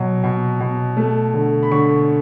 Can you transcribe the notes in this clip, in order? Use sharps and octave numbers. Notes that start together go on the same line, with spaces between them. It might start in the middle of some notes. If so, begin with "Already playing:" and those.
Already playing: B2 F#3
B2
B2
A3
D3
B5
D3 C#6